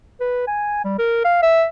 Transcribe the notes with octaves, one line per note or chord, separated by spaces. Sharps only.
B4
G#5
G3
A#4
F5
E5